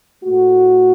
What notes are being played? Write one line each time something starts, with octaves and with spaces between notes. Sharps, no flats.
A2 A3 F#4